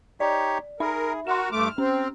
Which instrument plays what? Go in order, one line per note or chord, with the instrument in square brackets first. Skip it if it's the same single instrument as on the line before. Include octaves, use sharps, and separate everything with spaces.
[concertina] D#4 G4 C#5 [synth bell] D5
[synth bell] D#4 E5 B5 [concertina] G#4 [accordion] A#4
[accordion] F#4 [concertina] A#4 [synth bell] C6 E7
[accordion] G2 A3 D6 [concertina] F6
[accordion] C4 [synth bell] C#4